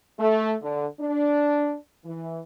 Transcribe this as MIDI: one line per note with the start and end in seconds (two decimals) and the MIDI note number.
0.19 0.54 57
0.62 0.87 50
1.00 1.75 62
2.05 2.40 52